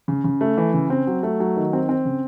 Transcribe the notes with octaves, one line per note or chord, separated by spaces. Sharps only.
C#3
C#3
A3
E3
C#3
C4
F#3
A3
F#3
D#3
C4
C4
C#3